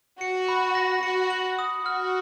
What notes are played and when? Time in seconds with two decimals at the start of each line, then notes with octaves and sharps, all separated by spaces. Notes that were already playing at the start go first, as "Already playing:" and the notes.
0.21 F#4 C#7
0.48 B5
0.75 A#6
1.03 F#4 C#7
1.30 F#7
1.59 D#6
1.85 F#4 F6